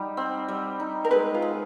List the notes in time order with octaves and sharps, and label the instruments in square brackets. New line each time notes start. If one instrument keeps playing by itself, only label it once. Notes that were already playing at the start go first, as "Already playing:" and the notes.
Already playing: [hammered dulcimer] G3 D#4
C4
G3
D#4
[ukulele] A#4
[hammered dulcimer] G#3 [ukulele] B4
[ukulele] F4
[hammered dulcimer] G#4